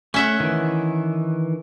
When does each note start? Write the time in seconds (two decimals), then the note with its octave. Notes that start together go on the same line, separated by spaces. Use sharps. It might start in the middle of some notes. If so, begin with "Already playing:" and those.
0.14 A3 C#4 E5 F#5
0.40 D#3 E3